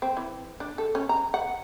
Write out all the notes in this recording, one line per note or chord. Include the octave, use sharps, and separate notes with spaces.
C4
E3
D4
A4
C#4
A#5
F#5